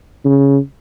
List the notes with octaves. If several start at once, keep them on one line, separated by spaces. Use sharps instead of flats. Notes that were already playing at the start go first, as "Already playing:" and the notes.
C#3